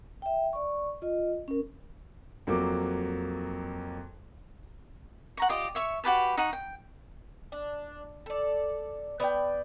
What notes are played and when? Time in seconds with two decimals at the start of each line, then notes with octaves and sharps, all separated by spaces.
0.22 E5 G5
0.53 D5 C#6
1.02 F4 D#5
1.48 C#4 A#4
2.47 F2 F#3 A#3 D6
5.37 F#5 A#5 C#6
5.49 F4 G4 D5 D#5
5.75 C#5 E5 C#6
6.04 F#4 G4 B4 A5
6.37 D#4 F#5 C#6
6.53 G5
7.52 D4
8.26 A4 D5
9.20 B3 D5 F5 G5